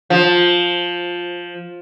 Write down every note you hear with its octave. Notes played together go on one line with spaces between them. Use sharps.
F3